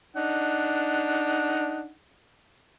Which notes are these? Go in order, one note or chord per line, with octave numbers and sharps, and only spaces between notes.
D4 D#4 F#5